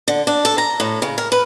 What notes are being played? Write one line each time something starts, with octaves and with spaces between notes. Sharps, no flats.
D3
D4
A4
A#5
A2
C#3
A#4
B4